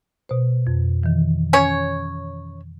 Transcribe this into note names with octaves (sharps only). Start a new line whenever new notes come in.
B2 C5
F2
D#3 E3
C#4 C#5